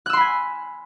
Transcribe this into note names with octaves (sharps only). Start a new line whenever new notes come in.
G#5 B5 C6 E6 F#6